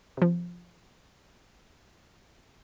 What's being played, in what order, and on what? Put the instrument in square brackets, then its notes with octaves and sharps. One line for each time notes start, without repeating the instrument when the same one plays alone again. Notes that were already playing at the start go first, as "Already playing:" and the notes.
[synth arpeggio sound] C3 F3